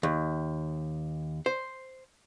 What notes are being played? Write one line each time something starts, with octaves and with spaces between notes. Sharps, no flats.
D#2
C5